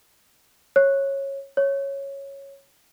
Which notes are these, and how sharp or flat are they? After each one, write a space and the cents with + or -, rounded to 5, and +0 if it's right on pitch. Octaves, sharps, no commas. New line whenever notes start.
C#5 -15
C#5 -5